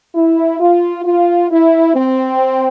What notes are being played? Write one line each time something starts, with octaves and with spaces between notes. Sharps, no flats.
E4
F4
F4
E4
C4